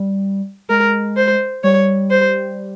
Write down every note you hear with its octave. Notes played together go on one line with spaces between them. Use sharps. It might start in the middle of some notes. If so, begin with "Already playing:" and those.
Already playing: G3
G#3 A#4
C5
G3 C#5
C5